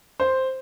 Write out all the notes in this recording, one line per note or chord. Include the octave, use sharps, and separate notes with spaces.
C5